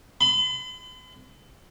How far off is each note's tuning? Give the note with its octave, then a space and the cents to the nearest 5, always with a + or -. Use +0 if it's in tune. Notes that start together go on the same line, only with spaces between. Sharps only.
B5 +45